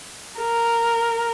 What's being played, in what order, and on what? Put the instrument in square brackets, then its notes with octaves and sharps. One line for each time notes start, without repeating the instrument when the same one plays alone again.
[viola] A#4